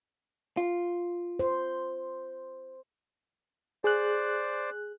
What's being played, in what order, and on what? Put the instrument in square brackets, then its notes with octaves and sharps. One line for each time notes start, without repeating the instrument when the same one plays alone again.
[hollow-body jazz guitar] F4
[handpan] C5
[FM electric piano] G#4 F#6 [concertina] C5 D5